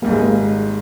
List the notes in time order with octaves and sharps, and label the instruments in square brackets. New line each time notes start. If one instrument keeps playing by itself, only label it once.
[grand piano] G#1 G#2 G3 [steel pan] A#3
[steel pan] G#3
A#3